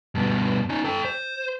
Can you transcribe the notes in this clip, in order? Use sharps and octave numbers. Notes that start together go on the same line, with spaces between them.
G2 B2
C#4 D#4
A4 G5
C5